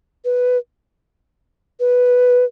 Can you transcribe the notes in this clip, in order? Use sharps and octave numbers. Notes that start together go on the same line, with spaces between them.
B4
B4